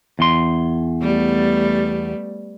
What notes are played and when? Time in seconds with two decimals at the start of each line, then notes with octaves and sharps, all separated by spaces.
0.19 E2 C6
1.02 G3 A3 B3